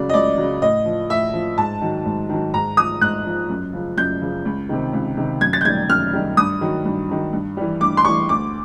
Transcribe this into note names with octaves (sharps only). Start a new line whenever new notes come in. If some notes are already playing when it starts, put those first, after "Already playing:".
Already playing: C#2 C#3 F#3 D5
D#5
C#2 D5
C#3 F#3
A2 D#5
F3
A2 E5
F3
G#2 A5
D#3 F#3
G#2
D#3 F#3
G#2 A#5
F3 D#6
G#2 F#6
F3
F#2
C#3 F3
F#2 G6
C#3 F3
C#2
C3 D#3
C#2
C3 D#3
F#2 G#6
A6
G6
D#3 G3 G#6
F#2 F6
D#3 G3
G2 D#6
D#3 F#3
G2
D#3 F#3
G2
E3 G3
G2 D6
C6
E3 G3 C#6
D2 D6